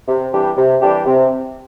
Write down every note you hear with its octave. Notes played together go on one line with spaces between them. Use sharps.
C3
E3 G3 D4 G4
C3
E3 G3 D4 G4
C3